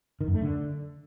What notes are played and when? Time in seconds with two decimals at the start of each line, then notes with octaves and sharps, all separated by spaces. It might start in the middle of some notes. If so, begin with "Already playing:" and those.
0.21 D#3
0.28 F#2
0.35 A3
0.42 D3